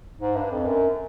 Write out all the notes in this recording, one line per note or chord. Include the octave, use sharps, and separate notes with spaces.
G#2
G2
F2
F#2